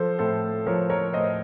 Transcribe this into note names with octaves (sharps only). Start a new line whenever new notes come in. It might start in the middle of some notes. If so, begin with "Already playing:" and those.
Already playing: F3 A4 C5
A2 A4 C5
F3 A#4 C#5
A#4 C#5
A2 C5 D#5